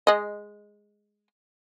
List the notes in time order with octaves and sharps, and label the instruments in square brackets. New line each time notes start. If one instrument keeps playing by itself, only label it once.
[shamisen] G#3 D#5